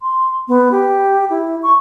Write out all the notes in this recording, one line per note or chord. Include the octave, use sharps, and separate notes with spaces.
C6
B3
G4
E4
C#6